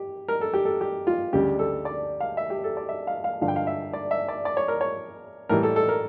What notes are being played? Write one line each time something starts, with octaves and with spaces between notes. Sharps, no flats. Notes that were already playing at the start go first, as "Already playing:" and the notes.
Already playing: G4
A#4
A4
G4
A4
G4
F4
D2 C#3 G3 G4
A4
D5
F5
E5
G4
A4
D5
E5
F5
F5
G2 D3 F3 F5
G5
F5
E5
D5
E5
D5
D5
C#5
A#4
C#5
A2 E3 G3 A#4
A4
A4
A#4